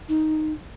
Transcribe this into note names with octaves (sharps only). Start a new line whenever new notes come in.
D#4